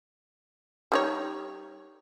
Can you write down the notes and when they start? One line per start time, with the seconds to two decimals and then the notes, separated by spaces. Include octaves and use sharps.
0.92 G3 D#4 C#5